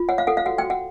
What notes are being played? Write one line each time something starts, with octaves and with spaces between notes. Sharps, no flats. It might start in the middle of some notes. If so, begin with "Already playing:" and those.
Already playing: F4
C#5 F#5
F5
A4 F#5
F5
F#4 F#5
G5
F#4
F#5